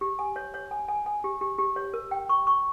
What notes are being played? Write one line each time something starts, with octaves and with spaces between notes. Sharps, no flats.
G4
G#5
C#5
C#5
G#5
G#5
G#5
G4
G4
G4
C#5
A#4
G5
C#6
C#6